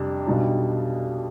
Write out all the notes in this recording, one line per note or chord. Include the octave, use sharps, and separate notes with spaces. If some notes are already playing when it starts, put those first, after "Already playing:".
Already playing: F2 C3 G3 D4
B1 B2 G3 D4